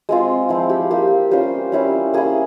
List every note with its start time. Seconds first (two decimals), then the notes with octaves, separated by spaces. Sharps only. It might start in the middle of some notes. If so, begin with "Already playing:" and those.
0.09 G#3 C4 F4
0.49 F3 C4 E4 F4
0.69 G4
0.90 A#3 F4 G4
1.31 G3 C#4 F4 C5
1.72 G3 C#4 E4
2.14 A#3 E4 G#4